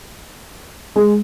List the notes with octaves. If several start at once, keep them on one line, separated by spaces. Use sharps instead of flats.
G#3